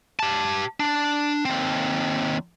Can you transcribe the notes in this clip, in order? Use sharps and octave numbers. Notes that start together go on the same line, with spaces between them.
G4 A5
D4
D#2 C4